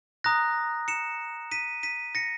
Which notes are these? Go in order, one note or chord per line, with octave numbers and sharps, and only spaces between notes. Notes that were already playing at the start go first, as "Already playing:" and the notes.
A#5 D#6 F#6 A#6
C#7 E7
B6 D#7
B6 D#7
A#6 C#7